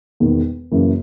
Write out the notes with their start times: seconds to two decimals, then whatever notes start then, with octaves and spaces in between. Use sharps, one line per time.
0.20 E1 E2 D#3
0.71 F#2 C#3 E3 A#3